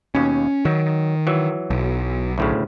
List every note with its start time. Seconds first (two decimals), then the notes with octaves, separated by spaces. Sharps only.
0.15 D#2 B2 C#4
0.65 D#3 F#3
1.27 E3 F#3
1.70 B1
2.38 D2 A2 C#3